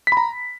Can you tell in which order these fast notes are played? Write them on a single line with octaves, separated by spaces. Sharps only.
B6 B5 A#5